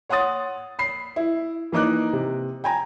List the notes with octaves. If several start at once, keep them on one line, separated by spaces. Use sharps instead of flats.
C#5 F#5 C6 D#6 A6
B5 C7
E4
E3 A#3 D#4 D6 F#6
C3
G5 G#5 A#5